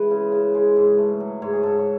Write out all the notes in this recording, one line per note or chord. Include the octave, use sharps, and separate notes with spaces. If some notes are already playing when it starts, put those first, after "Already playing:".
Already playing: E3 G#3 B4
C#3
C#3
G#3
G#2
A3
F#3
G#2 C#5
G#4
G#2 A4
C#5